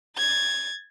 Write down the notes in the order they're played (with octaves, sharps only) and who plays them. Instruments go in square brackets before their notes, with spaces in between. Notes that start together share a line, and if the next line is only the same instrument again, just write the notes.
[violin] G#6 A6